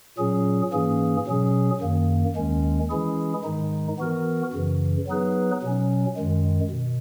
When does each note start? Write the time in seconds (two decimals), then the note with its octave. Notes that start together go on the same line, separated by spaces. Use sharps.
0.18 A#2 F#3 C#4 G#4
0.73 G#2 E3 A#3 C#4 G#4
1.27 B2 F#3 C#4 G#4
1.81 F#2 D#3 A#3
2.36 D#2 D#3 G#3 C#4
2.90 E3 G#3 C#4 E4 G#4
3.44 G#2 D#3 G#3 D#4
3.99 E3 B3 F#4 A#4
4.53 F#2 C#3 E3
5.07 F#3 B3 D#4 G#4 B4
5.62 B2 F#3 C#4
6.17 F#2 D#3 G#3
6.70 B2